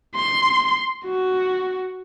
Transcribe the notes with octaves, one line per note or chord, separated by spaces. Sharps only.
C6
F#4